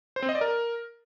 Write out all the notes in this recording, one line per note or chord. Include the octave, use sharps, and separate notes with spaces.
C5
C4
D#5
D5
A#4